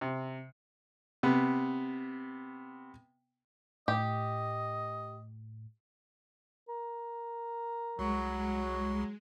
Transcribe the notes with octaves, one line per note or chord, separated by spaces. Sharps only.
C3
C3 B3
A2 G4 D#5
A#4
C2 F#3 G#3